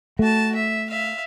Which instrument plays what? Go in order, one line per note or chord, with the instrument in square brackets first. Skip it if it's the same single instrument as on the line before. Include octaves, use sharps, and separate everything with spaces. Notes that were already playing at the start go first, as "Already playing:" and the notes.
[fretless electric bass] A3 [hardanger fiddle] F#4 A5
[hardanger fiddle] E5
E5 F5